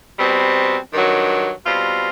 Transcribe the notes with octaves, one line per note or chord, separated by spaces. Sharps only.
B2 G3 C4
G2 D#3 F#3
B2 G3 C4 F4